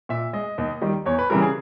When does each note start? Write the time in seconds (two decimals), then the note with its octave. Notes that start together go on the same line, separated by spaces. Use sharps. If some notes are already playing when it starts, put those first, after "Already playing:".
0.09 A#2 E5
0.33 G#3 D#5
0.58 D#2
0.82 D#3 G3
1.06 E2 C#5
1.19 B4
1.30 C#3 E3 G3 A#4
1.42 G#4